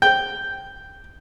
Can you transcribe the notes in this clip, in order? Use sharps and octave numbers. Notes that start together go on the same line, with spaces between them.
G5